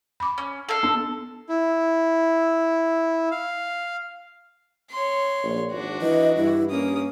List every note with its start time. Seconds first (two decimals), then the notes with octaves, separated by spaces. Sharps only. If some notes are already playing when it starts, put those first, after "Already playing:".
0.20 B5 D6
0.38 C#4
0.69 A4 F5
0.83 B3 D4
1.49 E4
3.31 F5
4.91 C#5 C6
5.43 A#1
5.72 G#1 D4 F#4
6.02 E3 D#5
6.36 G2 E4
6.70 A#3 C#4 D#6